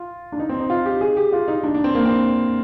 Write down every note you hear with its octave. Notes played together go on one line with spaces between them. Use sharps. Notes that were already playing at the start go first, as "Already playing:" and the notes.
Already playing: F4
D4
D#4
C4
D#4
F4
G4
G#4
G4
F4
D#4
D4
D4
C4
A#3
C4